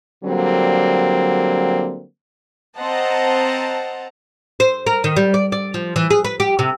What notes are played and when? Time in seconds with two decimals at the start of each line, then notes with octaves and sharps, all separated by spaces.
0.24 D3 F#3 G3 A#3 C4
2.79 C4 C5 D#5 F#5 A5 A#5
4.60 C5
4.87 A#4
5.04 D#3
5.16 G3
5.34 D5
5.52 D5
5.74 F3
5.96 E3
6.10 G#4
6.24 B4
6.40 G4
6.59 C3